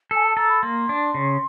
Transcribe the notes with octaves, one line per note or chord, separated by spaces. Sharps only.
A4 G#5
A5
A4 A#5
B5
A#3 C6
D4
C#3